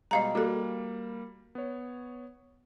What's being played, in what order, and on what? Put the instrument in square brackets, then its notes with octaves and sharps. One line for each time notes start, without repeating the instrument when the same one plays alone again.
[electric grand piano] B2 G3 G#3 [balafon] D#5 F5 A#5
[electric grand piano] G3 A#3 [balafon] F#4 A4
[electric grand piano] B3 C#5